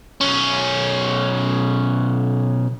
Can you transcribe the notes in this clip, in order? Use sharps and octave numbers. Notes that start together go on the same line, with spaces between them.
B1 C#4